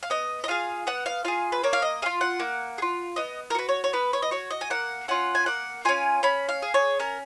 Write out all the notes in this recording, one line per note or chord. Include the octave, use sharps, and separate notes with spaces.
F5
B3 D#5
D#5
F4 G#4 F5
B3 F#5
F5
F4 G#4 F5
B4
A#3 C#5
F5
D#5
F4 G#4 F5
F#5
A#3
G#4
F4
B3 D#5
A#4
F#4 B4
C#5
C#5
B3 B4
C#5
D#5
F#4 C#5
D#5
G#5
A#3 F#5
C#4 F4 F#5
G#5
A#3 F#5
C#4 F4 G#5
C#4 B5
F5
G#4
C#5
C#4 A#4